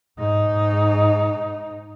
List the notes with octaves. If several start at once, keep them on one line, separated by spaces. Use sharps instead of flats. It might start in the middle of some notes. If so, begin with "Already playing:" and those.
G#2 D#4